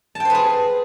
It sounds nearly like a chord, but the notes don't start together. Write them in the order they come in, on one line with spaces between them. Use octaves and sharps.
A5 G5 C5 B4 G#4